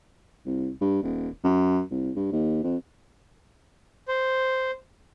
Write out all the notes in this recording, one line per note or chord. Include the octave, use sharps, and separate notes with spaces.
C2
G2
D#1
F#2
C2
G2
D#2
F2
C5